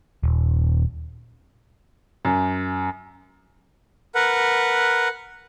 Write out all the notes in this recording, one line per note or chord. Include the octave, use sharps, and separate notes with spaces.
D#1
F#2
A#4 B4 F#5